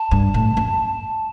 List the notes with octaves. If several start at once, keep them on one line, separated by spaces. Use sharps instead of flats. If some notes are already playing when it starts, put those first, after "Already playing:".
Already playing: A5
G2
A2
F#2